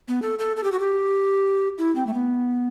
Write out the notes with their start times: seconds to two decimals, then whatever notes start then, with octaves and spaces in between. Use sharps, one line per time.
0.08 B3
0.22 A4
0.39 A4
0.56 A4
0.64 G4
0.72 F#4
0.79 G4
1.78 E4
1.96 C4
2.07 A3
2.14 B3